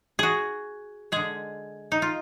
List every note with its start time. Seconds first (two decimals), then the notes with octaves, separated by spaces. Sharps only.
0.19 F#4 G#4
1.12 D3 G#3 G#4
1.92 D#4
2.02 F4